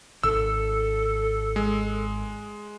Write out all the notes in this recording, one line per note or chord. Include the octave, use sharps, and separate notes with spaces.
G#1 A4 E6
G#3